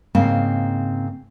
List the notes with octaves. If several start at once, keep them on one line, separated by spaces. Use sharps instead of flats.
G#2 C#3 A#3 C4 A#4 F5